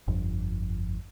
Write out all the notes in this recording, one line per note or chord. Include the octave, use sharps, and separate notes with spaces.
G1 F2